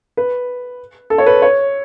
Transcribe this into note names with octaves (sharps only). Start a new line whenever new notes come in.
B4
A4
C#5
B4
C#5